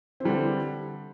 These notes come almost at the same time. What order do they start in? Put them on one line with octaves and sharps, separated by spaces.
C4 E3 G3 D3